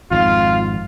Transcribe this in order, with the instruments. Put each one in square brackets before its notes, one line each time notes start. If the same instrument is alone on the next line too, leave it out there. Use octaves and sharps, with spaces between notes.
[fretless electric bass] G#1 F2 G#2 [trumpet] F4